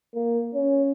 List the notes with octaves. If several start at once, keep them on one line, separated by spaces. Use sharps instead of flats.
A#3
C#4